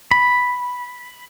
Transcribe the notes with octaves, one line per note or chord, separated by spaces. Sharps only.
B5